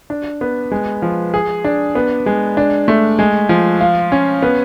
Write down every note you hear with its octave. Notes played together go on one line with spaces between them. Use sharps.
D4
B3
G#3
F3
G#4
D4
B3
G#3
D4
A3
G#3
F3
F4
C#4
B3